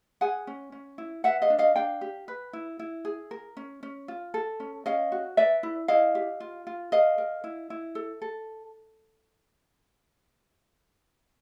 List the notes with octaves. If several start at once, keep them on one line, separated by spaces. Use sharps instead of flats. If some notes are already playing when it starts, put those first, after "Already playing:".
G#4 F#5 G#5
C#4
C#4
E4
B4 E5 F#5
D#5 F5
D4
D#5 F5
D4 F5 G5
G4
B4
E4
E4
G#4
A#4
C#4
C#4
F4
A4
C#4
C#4 D#5 F5
F#4
B4 D5 E5
E4
E4 D#5 F5
G4
F4
F4
A#4 D#5 F5
A#4
E4
E4
A4
A4